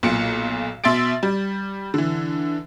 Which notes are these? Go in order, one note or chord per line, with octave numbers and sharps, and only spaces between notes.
B1 A#2 C#7
B2 E5 C6 A6 D7
G3
D3 E3